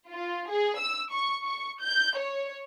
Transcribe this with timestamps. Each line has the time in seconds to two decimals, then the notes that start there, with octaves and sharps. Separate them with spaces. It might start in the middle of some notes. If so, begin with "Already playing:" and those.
0.11 F4
0.50 G#4
0.80 E6
1.12 C#6
1.44 C#6
1.82 G6
2.17 C#5